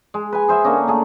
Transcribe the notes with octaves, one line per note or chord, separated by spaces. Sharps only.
G#3
B4 G#5
G#4 C5 E5 F#5
D3 A#3 C#4 D#4
A3 G#4